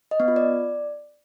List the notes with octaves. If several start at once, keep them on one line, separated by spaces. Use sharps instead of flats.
D#5
B3
F4
D5